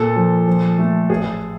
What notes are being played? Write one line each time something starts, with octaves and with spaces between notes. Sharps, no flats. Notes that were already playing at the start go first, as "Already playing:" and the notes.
Already playing: A#2 A4
F3
F3
A3
A1 G#4